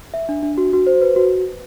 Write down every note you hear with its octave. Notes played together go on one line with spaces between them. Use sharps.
E5
D4
D4
F#4
F#4
C5
B4
F#4